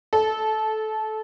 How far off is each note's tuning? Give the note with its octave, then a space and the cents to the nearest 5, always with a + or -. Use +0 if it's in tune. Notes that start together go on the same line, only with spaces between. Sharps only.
A4 -20